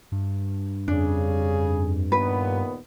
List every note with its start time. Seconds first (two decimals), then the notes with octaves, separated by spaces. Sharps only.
0.12 G2
0.88 F2 C#3 D4 G#4
2.12 D#2 A#2 B3 B4